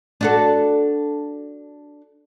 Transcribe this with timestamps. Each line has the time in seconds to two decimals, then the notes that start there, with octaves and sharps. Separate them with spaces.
0.21 D4 F#4 A4